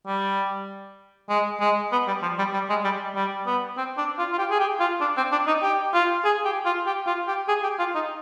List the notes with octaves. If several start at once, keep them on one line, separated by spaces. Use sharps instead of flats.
G3
G#3
G#3
B3
G3
F3
G3
G3
G#3
G3
G3
B3
C4
D4
F4
F4
G4
G#4
G4
F4
D4
C4
D4
D#4
G4
F4
G#4
G4
F4
G4
F4
G4
G#4
G4
F4
D#4